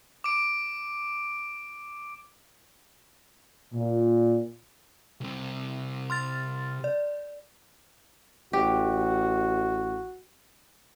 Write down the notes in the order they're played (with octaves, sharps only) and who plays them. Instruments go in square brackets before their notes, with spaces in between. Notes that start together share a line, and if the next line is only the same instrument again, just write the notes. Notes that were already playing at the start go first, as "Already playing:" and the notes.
[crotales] D6 D7
[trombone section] A#2
[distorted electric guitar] C2 C3
[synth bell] C6 F6 A6
D5
[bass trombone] A1 [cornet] F#4 [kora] G4